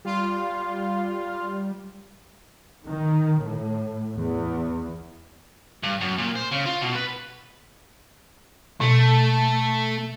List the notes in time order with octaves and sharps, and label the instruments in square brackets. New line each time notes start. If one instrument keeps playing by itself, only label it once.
[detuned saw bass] G3 [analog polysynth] F4
[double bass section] D#3
A2
E2
[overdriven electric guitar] G2
F#2
A#2
C5
C#3
F4
B2
B4
[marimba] B2 [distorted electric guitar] A3